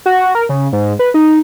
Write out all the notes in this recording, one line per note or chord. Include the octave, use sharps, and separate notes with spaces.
F#4
A#4
C#3
G#2
B4
D#4